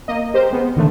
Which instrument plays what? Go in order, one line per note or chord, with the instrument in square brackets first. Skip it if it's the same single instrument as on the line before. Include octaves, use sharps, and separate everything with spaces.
[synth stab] A#3 D#5
G4 A#4 C5
G#3 B3
B1 D3 D#3 A3